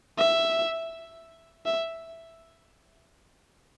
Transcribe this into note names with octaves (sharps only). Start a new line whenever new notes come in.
E5
E5